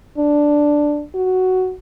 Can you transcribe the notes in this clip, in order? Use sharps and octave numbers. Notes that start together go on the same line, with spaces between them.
D4
F#4